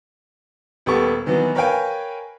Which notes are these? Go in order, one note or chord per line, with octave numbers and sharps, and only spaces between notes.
D#1 B3 G4 A4 C#6
D#3 E3 F#3 B3
A#4 B4 C#5 F5 G5 G#5